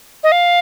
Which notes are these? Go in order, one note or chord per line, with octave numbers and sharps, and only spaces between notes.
D#5
F5